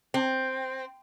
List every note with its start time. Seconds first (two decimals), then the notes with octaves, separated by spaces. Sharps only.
0.14 C4